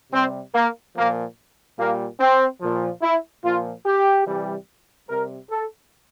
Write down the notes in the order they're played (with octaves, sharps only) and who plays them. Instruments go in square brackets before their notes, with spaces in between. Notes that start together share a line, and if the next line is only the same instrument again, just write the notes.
[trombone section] C3 G3 C4
A#3
A#2 F3 A#3
A#2 G3 A#3
C4
A#2 F3
E4
A#2 F3 F4
G4
C3 E3 G3
C3 G3 A#4
A4